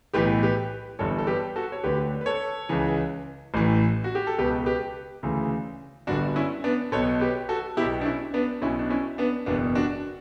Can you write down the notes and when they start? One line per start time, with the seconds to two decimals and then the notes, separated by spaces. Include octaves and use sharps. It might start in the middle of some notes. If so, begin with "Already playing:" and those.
0.14 B1 A2 E3 G4 B4
0.43 G4 B4
0.99 G1 G2 E3 A4 C#5
1.18 A4
1.27 G4 B4
1.56 F#4 A4
1.72 C#5
1.84 D2 D3 G4 B4
2.21 B4
2.26 A4 C#5
2.69 C#2 C#3 E3
3.54 A1 A2 E3
4.04 F#4
4.15 G4
4.27 A4
4.38 C#2 B2 G4 B4
4.66 G4 B4
5.23 D2 C#3 E3
6.07 G1 G2 D3 D4 F#4
6.36 C#4 E4
6.64 B3 D4
6.92 B1 B2 A4 C#5
7.20 G4 B4
7.49 F#4 A4
7.77 B2 E4 G4
7.81 B1
8.01 D4
8.05 C#4 E4
8.34 B3 D4
8.62 B1 C#4 E4
8.66 B2
8.79 D4
8.90 C#4 E4
9.18 B3 D4
9.46 F#1 E2 B2 B3 D4
9.75 D4 F#4